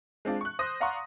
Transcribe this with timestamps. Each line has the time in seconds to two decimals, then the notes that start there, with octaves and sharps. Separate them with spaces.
0.25 G#3 C4 D4 F4
0.41 C#6 F#6
0.59 C5 C6 D#6 A#6
0.80 D5 F5 F#5 A#5 C6 C#6